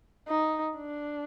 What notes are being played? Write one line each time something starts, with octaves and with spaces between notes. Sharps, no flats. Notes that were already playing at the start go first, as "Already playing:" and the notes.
D#4
D4